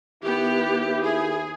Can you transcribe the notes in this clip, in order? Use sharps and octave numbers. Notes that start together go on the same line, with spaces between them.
D#2 B3 E4 G4
G#4